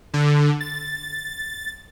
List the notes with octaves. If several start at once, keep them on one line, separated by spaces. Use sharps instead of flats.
D3
A6